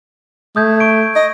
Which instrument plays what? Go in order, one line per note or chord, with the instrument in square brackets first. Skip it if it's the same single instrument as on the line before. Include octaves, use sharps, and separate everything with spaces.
[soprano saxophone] A3 [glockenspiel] D#6 G6 G#6
[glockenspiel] C#6 D7
[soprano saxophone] D#5